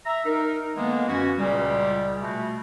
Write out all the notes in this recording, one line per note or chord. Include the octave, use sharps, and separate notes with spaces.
E5 A#5
D#4 A#4
D3 E3 G#3 A#3 B3
F#2 E3 C#4 F#4
C#2 A#2 C#3 G3
B2 A3